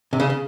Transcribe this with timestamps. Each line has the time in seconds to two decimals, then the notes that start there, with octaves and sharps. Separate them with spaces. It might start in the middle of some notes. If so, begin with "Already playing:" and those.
0.13 C3
0.20 C#3
0.30 C#3